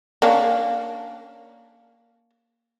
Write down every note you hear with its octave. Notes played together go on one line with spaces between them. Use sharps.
A#3 C#4 D4